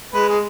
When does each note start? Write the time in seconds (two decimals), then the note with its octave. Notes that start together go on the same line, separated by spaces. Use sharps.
0.13 G#3 B4
0.28 G#4